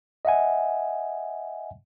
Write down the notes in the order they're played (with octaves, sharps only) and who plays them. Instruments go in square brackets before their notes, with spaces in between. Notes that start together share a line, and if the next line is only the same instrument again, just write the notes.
[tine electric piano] D#5 E5 F#5 G#5